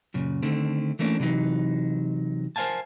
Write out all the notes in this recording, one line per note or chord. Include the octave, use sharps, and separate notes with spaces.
F#2 A#2 C#3
D3 D#3 A3 C4
E3 A3 A#3 C#4 D4
C3 E3 F#3 D#4
A#4 C5 C#5 F5 G#5 A5